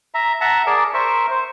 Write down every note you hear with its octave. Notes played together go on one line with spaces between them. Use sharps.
E5 A#5
E5 F#5 A5 A#5
G#4 A#4 D5 A5
A#4 C5 E5 C#6
C5